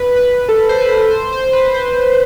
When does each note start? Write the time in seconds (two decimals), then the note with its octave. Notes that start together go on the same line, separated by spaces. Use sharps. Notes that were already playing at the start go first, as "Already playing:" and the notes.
Already playing: B4
0.16 B4
0.49 A4
0.69 C5
0.80 B4
1.11 C5
1.33 C5
1.53 B4
1.74 C5